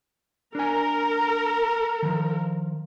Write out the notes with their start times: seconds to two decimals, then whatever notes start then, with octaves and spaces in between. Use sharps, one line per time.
0.55 D4 A#4 G#5
2.02 D#3 F3